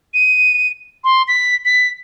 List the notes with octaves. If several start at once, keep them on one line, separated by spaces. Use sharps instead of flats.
D#7
C6
B6
B6